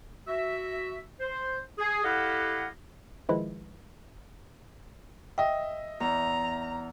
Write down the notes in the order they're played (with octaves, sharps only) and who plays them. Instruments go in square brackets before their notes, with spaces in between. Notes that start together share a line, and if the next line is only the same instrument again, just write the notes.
[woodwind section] F#4 E5
C5
G#4
E4 G4 A4 D#5 F5 F#5
[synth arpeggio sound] D#3 F3 G#3 E4 B4
[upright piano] D#5 E5 [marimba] G5
[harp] E2 [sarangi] A#5